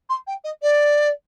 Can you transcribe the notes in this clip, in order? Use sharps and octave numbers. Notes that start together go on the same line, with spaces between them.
C6
G5
D#5
D5